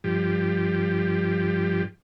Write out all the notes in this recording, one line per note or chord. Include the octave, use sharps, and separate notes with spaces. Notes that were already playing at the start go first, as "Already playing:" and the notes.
G2 F3 G4